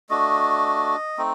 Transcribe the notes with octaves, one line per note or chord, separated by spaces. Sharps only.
A3 D4 F#4 D#5
A3 C4 D#4